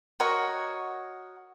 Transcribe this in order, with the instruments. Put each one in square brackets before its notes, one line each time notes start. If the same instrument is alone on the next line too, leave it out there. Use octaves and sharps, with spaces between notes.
[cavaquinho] F#4 A#4 C#5 D#5